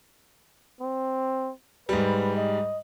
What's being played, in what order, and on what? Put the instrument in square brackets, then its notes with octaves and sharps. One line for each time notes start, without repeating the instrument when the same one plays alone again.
[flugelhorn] C4
[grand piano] G#2 G3 [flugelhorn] B4
[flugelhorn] D#5